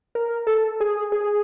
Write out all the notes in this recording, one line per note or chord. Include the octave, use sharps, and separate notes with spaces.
A#4
A4
G#4
G#4